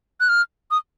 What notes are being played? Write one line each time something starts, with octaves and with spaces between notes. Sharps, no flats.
F#6
F6
D#6